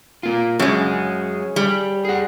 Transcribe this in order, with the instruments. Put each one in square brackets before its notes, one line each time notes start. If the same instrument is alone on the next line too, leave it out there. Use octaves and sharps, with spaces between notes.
[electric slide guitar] A#3 F4
[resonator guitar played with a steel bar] F#2 G#3 [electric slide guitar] G#4 C#5
[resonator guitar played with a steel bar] G3
[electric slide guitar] G#4 F#5